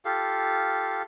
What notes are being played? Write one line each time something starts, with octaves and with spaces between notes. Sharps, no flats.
F4 G4 A4 F5